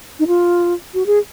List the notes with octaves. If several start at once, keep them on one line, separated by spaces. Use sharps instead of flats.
D#4
F4
F#4
G#4